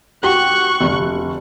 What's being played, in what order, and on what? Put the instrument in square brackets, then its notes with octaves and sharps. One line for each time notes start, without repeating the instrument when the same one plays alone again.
[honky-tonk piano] F#4 G4 [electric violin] C#6 F#6
[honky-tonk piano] F1 D2